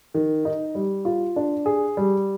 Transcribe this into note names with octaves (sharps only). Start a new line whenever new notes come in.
D#3
D#4
G3
F4
D4
G#4
G3